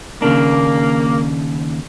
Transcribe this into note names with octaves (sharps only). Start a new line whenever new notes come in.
D#2 C#3 A#3 D4